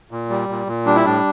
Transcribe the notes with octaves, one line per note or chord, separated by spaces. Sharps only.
A#2
G3
A#2
A#2
G3 D4
E4
A2 D4